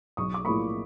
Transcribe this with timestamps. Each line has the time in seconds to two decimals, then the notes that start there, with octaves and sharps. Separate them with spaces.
0.17 B1 C#6 D#6
0.34 D6
0.44 A2 F3 A#3 B5 C#6